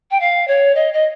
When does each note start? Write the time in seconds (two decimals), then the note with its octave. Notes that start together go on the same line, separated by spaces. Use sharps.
0.10 G5
0.20 F5
0.47 C#5
0.75 D#5
0.93 D#5